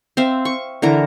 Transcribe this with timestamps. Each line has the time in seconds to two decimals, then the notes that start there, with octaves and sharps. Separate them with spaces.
0.17 C4 E5 F5
0.45 C#6
0.82 D3 E3 A#4 A#5